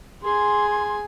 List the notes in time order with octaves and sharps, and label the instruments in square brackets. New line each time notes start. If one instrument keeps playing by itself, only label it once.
[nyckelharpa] G#4 G#5 [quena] C6